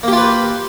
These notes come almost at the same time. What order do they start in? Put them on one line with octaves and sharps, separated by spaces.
A#3 G4 F4 B4